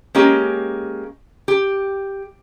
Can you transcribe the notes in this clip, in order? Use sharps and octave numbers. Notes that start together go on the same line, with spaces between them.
G#3 A#3 C#4 G4
G4